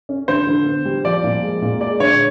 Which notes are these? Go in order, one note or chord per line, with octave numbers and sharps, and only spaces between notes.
C#4
D3 C5
D3
B3
G3
F3 D5
A#2
G#3
A#2
G#3 D5
D3 C#5